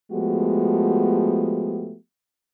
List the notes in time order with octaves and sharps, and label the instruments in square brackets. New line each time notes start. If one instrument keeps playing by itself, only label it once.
[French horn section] F3 G#3 A3 B3 F#4 G4